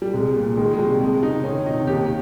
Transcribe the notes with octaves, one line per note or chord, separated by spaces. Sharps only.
G3
C2 G#3
A#2
D#3 G#3
G#3
C3 G3
F2 G#3
C#3 D#4
D#3 C#4
C3 D#4
D#2 G4